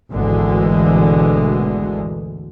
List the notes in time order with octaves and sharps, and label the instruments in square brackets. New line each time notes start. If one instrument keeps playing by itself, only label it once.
[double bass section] G#1 D2 B2 D3 E3 G#3